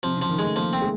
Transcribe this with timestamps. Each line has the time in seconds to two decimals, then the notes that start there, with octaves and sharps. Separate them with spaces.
0.03 C3 F3
0.17 C#3
0.22 F3
0.29 D#3
0.39 G#3 A3
0.56 F3 A#3
0.73 C4
0.82 G#3